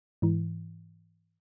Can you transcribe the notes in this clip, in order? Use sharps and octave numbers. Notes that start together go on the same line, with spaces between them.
G#2 E3